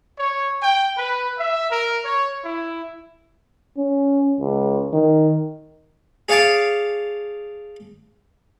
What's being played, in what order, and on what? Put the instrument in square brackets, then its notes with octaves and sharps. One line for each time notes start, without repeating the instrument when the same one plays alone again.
[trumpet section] C#5
G5
B4
E5
A#4
C#5
E4
[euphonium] C#4
C#2
D#3
[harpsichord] G#4 C#5 F5 G#5 A5 D6